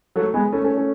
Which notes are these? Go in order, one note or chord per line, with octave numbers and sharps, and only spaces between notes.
F#3 A3
G#3 B3
A3 C#4
A3 C#4
A3 C#4